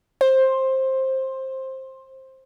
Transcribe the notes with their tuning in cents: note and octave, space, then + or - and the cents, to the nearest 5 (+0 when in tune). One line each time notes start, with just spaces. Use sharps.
C5 +15